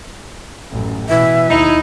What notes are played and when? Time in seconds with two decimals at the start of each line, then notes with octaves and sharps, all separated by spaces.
0.71 A1 F#2
1.09 B2 E3 E5
1.49 D#2 D#4 E4